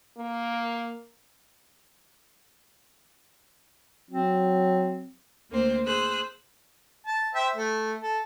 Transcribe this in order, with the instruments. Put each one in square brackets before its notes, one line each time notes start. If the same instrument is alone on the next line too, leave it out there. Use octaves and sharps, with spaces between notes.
[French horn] A#3
[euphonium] F#3 [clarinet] C4
[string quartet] D2 A#3 C4 C5
G#4 C5 E6 F#6
[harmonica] A5
C5 E5 G5
A3
A4